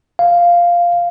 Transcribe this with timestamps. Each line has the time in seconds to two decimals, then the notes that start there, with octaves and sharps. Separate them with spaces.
0.19 F5